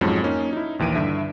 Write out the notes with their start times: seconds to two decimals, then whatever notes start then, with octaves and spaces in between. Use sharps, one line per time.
0.01 F2 G#2 F3 F#3 G#3 C#4
0.23 A#3 C#4 D#4
0.53 D#4 E4
0.79 A#1 D#2 E3 D7 D#7
0.95 G2 D3 E5